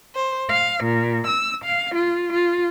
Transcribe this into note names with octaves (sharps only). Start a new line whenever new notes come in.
C5
F5
A#2
E6
F5
F4
F4